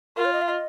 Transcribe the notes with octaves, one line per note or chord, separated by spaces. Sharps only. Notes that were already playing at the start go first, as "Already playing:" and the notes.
F4 A#4
C#5
D#5
F5
D#5